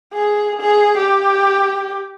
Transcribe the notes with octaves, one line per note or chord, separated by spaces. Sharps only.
G#4
G#4
G4